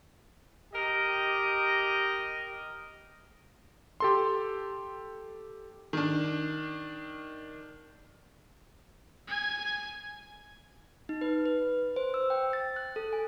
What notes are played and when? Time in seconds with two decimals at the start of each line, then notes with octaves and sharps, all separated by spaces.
0.73 G4 A#4 D#5
4.00 G4 A4 C6
5.93 D#3 D4
9.28 G#5 G#6
11.09 D#4
11.21 B4
11.45 B4
11.96 C5
12.14 E6
12.30 G5
12.53 A6
12.76 F#6
12.96 A4
13.13 G#5